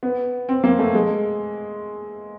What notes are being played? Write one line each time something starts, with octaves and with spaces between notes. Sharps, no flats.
B3
C4
A#3
A3
G#3